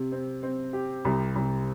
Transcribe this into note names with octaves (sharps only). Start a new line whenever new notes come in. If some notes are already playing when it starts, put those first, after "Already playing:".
Already playing: C3
C4
C4
G4
C2
C2